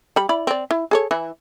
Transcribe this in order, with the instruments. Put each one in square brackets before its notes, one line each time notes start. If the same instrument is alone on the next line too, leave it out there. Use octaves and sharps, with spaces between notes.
[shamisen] G3 B5
E4 D5 B5
C4 D5
E4
G#4 A4 C#5
E3 E4